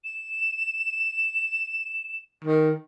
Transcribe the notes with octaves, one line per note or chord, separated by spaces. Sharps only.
E7
D#3